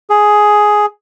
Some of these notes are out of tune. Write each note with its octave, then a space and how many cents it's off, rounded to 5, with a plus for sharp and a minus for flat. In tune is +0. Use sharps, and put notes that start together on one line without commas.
G#4 +5